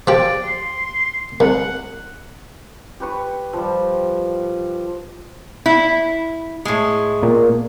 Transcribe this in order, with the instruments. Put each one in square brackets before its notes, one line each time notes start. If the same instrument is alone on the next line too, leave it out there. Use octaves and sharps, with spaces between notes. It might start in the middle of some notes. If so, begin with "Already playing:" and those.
[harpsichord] F3 G4 [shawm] D5
[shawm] C6
[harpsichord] C2 [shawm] F#5
[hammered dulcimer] G4 B4 C#6
F3 G3
[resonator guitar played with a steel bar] E4
A2 G#3
[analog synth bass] A#2